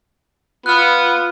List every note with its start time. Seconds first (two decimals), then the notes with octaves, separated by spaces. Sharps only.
0.66 B3 F4 F6 F#6